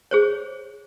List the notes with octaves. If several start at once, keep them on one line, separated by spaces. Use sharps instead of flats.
G#4 C5 C#5